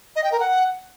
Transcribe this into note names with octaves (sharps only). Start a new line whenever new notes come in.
D#5
G5
A#4
F#5